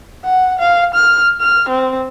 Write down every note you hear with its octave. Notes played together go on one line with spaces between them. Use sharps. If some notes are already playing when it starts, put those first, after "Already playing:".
F#5
F5
F6
F6
C4